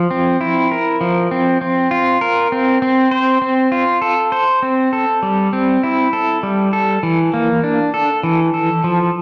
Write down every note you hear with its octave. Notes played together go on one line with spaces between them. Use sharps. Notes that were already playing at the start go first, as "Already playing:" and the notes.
Already playing: F3
C4
E4
A#4
F3
C4
C4
F4
A#4
C4
C4
C5
C4
F4
A4
C5
C4
A4
G3
C4
E4
A4
G3
A4
E3
A#3
D4
A4
E3
A4
F3